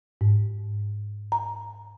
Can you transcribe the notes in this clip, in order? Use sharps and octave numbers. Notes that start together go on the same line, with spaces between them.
G#2
A#5